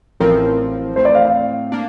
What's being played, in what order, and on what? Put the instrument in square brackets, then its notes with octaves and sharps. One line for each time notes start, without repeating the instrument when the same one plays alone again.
[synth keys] A1 A2 F3 C4 [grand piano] A#4
[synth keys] A2 A3 C4 [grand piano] C5
[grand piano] D5
F5
F5
[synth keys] A#3 D4